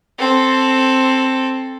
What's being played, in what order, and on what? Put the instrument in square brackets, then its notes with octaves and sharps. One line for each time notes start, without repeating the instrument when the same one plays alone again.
[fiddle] C4 A4